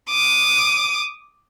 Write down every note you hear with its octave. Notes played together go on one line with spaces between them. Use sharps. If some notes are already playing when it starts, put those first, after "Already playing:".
D6 D#6